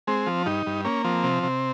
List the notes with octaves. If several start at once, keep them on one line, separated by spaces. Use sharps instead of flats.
G#3 C4
F3
G2 D#4
G2
A#3 C#4
F3 C4
C3
C3